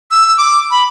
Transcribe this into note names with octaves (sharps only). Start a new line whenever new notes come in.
E6
D6
B5